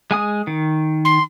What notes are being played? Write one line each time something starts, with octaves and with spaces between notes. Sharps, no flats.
G#3 G#5 D#6
D#3
C6